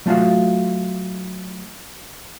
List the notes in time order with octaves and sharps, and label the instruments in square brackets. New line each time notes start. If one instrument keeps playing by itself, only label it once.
[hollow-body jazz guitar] F#3 A3 F4 F#4 F5